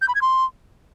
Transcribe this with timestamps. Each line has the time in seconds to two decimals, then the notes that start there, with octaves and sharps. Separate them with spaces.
0.02 G6
0.08 B5
0.15 G#6
0.22 C6